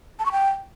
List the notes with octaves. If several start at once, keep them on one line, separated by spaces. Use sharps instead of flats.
A5
C#6
G5